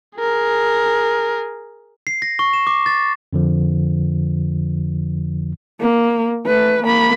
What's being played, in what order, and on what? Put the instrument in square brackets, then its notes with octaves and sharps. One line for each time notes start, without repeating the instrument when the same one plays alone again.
[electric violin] G#4 A#4
[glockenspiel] C7
A#6
C#6
E7
D6
A6
[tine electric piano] F2 D3 F3
[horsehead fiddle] A#3
A3 B4
A#3 B5